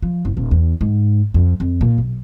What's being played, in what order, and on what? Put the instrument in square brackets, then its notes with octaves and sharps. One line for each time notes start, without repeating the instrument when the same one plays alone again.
[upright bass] F3
F#1
D#1
E2
G#2
F2
F2
A#2
B1